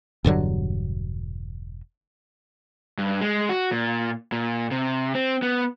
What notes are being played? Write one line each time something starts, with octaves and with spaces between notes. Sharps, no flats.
E1 G2 D3 F#3
G2
G#3
F#4
A#2
A#2
C3
C4
B3